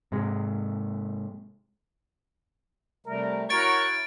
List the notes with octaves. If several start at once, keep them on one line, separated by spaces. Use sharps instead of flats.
G#2 C3 G#3
C3 G3 A3 A#4
E4 F#4 A#4 C#5 A6 D7